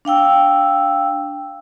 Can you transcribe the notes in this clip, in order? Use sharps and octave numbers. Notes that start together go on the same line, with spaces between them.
D4 F5 G5 E6